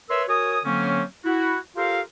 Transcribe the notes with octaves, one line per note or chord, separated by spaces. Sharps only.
A#4 B4 C#5 E5 C6 E6
F#4 A#4 C#5 G#5 D#6
D3 F#3 A#3 C4 C#4
E4 F#4
F4 G4 A4 A#4 C5 F5